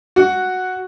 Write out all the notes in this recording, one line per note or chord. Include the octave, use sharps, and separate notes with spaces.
F#4